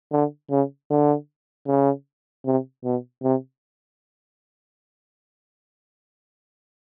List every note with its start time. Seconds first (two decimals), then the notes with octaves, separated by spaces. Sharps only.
0.12 D3
0.50 C#3
0.90 D3
1.67 C#3
2.45 C3
2.84 B2
3.23 C3